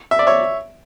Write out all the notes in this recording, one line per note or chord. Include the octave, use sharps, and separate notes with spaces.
E5
D5
C#5 E5